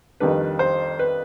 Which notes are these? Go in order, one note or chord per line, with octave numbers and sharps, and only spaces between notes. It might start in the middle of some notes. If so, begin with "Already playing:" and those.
F2 D#3 G3 D4 B4
C5
B4